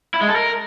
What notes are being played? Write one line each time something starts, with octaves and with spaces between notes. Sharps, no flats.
E4
G#3
A4
A#4